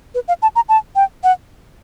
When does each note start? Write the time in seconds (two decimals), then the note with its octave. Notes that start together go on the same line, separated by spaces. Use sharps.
0.15 B4
0.28 F5
0.42 A5
0.56 A#5
0.69 A5
0.96 G5
1.24 F#5